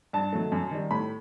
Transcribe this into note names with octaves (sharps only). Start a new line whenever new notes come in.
G2 A5
D#3 F#3 A3
F#2
D#3 G3
A2 B5